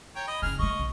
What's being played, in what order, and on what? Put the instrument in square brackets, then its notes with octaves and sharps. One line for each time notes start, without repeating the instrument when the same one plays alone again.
[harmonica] C#5 G5 A#5
D#5 B5
[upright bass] F#1 A2 [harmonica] G#4 F6
[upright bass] G#3 A3 [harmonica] D#5 C#6
[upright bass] B1